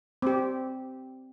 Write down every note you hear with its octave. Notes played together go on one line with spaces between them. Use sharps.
C4 G4